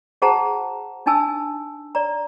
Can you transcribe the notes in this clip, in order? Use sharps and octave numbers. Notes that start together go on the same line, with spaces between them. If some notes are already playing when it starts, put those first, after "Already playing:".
F#4 G#4 C5 F#5 A5 A#5
D4 D#4 G#5 A5 E6
D5 A#5